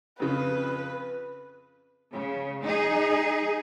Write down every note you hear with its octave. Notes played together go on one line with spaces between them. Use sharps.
F2 C#3 B4
C#3
D#4 G#4